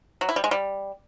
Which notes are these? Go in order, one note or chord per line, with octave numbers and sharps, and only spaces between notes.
F#3
E4
G3
G#3
G3